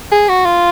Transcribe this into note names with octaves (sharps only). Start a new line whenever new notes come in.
G#4
F#4
F4